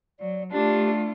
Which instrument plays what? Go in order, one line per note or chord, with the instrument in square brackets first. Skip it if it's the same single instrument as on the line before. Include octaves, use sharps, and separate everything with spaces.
[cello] F#3 [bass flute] D5
[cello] A3 F4 [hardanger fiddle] D4 [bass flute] G4